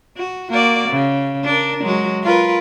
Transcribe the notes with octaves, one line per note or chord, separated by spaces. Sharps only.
F#4
A#3 F#4 D5
C#3
D4 A#4
F#3 G#3 F#4
F4 A#4 B4